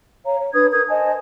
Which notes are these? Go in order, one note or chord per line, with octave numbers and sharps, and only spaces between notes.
C#5 F5 A#5
C#5
D4 B4 D#6 G#6
A#4 D#6 G6 G#6
C5 D#5 G#5 A5